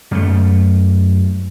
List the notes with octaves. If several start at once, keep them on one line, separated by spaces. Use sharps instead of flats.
F#2 A3